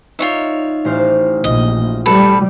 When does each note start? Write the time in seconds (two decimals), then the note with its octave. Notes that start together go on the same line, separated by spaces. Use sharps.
0.19 D#4 F4 C#5 D5 E5
0.85 A1 C5 F5
1.44 A#1 D#5
2.06 G3 A4 B4